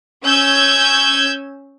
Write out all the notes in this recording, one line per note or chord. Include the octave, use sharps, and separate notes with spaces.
C#4 E6 G6 G#6